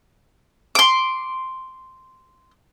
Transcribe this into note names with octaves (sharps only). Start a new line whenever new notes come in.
C6 D6